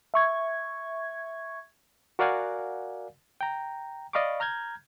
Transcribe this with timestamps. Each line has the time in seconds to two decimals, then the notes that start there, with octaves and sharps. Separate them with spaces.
0.14 E5 C#6 G#6
2.19 F#4 A#4 D5 F5 F#5 G#5
3.41 G5 A#5
4.13 D5 D#5 F5 B5 C#6 D6
4.40 A#5 F6 G6 G#6